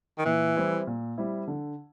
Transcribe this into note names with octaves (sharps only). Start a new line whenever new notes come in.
D#3
A#2 E3
G3 C4 E4
A#2
G3 C4 E4
D3